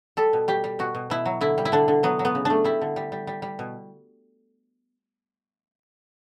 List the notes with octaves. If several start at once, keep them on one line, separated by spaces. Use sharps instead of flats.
G3 A4
B2
G3 G4
G3
B2 F#4
B2
B2 E4
F#3
D3 E4
G3
E4
D3 D4
D3
F#3 B3
F#3
B3
C#3
A3 D4
G3 E4
D3
G3
G3
G3
G3
B2